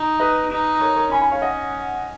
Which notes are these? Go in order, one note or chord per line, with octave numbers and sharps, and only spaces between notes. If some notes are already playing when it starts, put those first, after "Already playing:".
Already playing: D#4
B4 D#5
D#4
A#4 C#5
A#4 C#5
C#4 G#5 B5
G#5 B5
C#5 F5
D#5 F#5